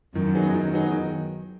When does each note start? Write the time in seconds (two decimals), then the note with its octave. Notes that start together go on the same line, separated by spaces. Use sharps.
0.15 F#2 D#3
0.35 F#3 B3 D#4 G#4
0.54 D#3
0.73 F#3 B3 D#4 G#4
0.92 D#3